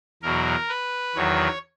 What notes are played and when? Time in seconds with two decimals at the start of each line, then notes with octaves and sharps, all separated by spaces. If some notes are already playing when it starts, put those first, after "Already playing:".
0.22 E2 B2 F#3 A#4
0.69 B4
1.15 E2 D#3 F#3 C#5